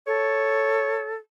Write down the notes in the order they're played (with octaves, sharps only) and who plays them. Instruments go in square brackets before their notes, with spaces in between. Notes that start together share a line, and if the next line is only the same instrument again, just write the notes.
[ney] A4 [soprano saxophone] C#5